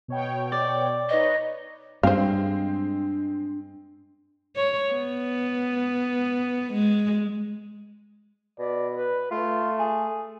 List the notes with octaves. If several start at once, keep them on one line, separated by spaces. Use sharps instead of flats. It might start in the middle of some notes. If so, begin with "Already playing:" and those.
B2 C#5 G5
D5
D#4 B4 C#5 D#5
G2 G#3 C4 D4 C5 F5
C#5
B3
G#3
B2 D5
B4
A3 F4
G#4